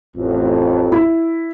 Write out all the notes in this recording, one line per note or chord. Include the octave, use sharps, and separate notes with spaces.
A1 F2
E4